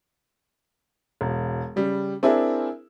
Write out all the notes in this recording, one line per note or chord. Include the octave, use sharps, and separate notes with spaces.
E1
C#3 G3
C4 D4 E4 G#4 A#4